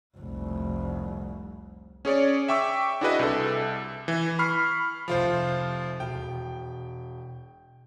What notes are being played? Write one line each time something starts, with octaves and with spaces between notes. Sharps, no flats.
F1 C2
C#4 G#4 C#5 D5
E5 G5 C#6 D6 E6
D4 E4 F#4 G#4 B4 D#5
C2 A4
E3
B5 C#6 F6 C7
F1 C2 F3 F4 C5 F7
E1 G5